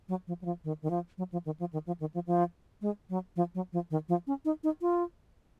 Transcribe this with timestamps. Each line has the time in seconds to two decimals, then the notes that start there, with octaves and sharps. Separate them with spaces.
0.09 F#3
0.27 F3
0.42 F#3
0.45 F3
0.64 D#3
0.82 D#3
0.90 F3
1.18 F#3
1.32 F3
1.46 D#3
1.60 F3
1.73 D#3
1.87 F3
2.00 D#3
2.14 F3
2.27 F3
2.82 G#3
3.10 F#3
3.36 F3
3.55 F#3
3.73 F3
3.91 D#3
4.09 F3
4.27 C#4
4.45 D#4
4.64 D#4
4.82 F4